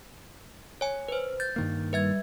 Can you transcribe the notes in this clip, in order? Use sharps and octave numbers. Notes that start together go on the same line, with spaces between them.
C#5 G#5
B4 C5
G6 A6
G2 D#3 A#3
G3 B4 E5 G#6